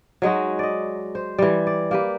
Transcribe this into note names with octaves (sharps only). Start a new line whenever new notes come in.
F#3 G#3 D#4 F#4
D5 D#5
C5
E3 G3
D5
A#3 G4 B4